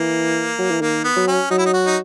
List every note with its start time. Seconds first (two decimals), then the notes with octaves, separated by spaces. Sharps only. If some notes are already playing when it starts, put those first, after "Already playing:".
Already playing: E3 A#3
0.59 F#3
0.71 E3
0.82 D#3 A#3
1.05 B3
1.16 F#3
1.28 C#4
1.51 F#3 D#4
1.59 E4
1.66 D#4
1.74 F#4
1.86 D#4